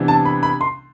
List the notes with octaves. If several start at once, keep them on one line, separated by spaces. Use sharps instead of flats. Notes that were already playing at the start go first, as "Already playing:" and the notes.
Already playing: C3 E3 B3 D4
A5
B5
B5
C6